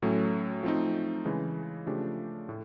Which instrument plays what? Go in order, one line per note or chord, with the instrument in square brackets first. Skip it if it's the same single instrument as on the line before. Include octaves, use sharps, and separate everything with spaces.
[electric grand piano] A2 F#3 A3 C#4
F3 A3 C4 D#4
C#3 E3 G#3
C#3 F3 A3 D4 G4
A2